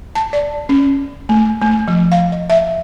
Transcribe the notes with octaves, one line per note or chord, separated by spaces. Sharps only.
A5
D5
C#4
A3
A3
F3
F5
D#5
E5